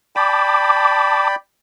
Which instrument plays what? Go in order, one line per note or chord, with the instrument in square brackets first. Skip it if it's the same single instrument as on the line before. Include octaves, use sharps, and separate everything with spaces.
[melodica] D5 G5 B5 [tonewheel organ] A5 D6